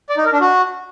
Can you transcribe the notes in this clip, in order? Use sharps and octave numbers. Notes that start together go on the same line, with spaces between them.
D5
D#4
A#4
D4
F#4